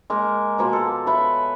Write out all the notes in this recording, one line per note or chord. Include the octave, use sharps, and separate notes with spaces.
G#3 A#3 A#4
B2 F3 A#3
A4
B4 C#5 E5